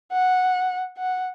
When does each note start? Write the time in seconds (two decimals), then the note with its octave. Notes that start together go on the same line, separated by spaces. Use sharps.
0.12 F#5
0.98 F#5